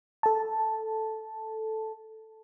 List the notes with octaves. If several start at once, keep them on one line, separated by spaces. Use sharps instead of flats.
A4 A5